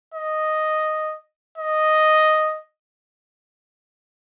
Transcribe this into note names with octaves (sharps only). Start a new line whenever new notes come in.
D#5
D#5